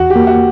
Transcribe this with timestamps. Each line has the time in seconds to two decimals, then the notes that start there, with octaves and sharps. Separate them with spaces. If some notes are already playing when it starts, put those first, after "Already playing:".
Already playing: E2 F#4
0.10 G4
0.16 A#3
0.27 F#4